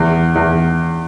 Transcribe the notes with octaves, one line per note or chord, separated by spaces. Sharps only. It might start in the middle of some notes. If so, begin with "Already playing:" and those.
Already playing: E2
E2